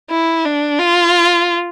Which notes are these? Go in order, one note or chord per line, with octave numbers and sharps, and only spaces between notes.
E4
D4
F4